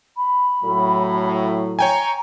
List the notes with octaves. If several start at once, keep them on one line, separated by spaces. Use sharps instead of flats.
B5
A2 F#3
C#5 G5 G#5 A#5